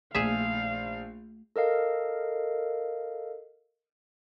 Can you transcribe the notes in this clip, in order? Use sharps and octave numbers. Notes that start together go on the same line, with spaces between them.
A#1 A3 G#4 E5 F5
A4 A#4 D#5 F5